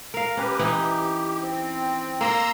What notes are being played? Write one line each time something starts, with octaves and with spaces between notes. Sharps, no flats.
A#4 F5
C#4 G4 B4
E3 D#4
G4
C4
A#3 A#5 C6 E6